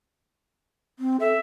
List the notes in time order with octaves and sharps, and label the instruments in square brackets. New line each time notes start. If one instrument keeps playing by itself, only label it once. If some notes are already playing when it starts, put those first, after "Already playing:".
[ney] C4
[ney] A4 [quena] E5